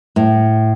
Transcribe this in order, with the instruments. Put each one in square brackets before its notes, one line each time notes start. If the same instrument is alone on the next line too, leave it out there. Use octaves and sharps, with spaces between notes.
[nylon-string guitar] A2